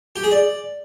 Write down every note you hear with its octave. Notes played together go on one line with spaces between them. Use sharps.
G4
G#4
D5